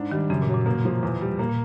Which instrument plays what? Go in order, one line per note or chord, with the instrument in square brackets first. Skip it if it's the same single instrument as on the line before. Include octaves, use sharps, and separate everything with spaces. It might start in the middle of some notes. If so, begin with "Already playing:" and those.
Already playing: [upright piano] G#2 D4
[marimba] D#3 [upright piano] G3
[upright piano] F#2 [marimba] C#3
[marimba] A#2
[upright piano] F#3
[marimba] A#2
[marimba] B2 [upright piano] A#3
[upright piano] F3
E2
G3
[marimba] A#2 [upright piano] A#3
[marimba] A#2